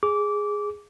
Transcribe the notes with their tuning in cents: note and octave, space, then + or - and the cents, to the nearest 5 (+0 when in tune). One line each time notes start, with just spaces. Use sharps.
G#4 -5 D6 -15